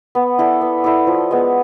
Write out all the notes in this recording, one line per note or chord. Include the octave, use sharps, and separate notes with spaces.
B3
E4 A4 D5
B3
E4 A4 D5
F3
G#3 B3